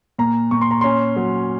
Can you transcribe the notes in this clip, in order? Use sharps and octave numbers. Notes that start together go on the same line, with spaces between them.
A#2 A#5
A#2 C#6
C6
A#5
C#4 C6
F#3